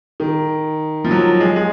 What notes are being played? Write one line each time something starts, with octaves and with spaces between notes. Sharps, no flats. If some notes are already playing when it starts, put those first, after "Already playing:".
D#3
F3
F#3
G#3
G#3